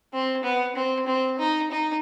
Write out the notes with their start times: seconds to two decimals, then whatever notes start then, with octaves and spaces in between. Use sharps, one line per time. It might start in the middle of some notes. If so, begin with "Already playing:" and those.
0.13 C4
0.44 B3
0.76 C4
1.07 C4
1.39 D#4
1.71 D#4